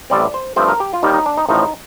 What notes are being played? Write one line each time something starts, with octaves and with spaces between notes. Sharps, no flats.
A1 A2 G3 C4 D5
C5
G2 F3 A3 C4 C5
A#4
G4
F4
D#2 D#3 G3 D#4
D#4
D4
D#4
A1 A2 F3 D#4